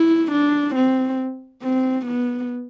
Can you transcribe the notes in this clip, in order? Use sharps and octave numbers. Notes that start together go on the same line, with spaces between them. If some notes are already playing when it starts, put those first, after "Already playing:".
Already playing: E4
D4
C4
C4
B3